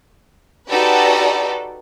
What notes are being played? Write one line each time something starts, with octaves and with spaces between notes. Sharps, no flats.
D#4 F#4 G4 A4 B4 D5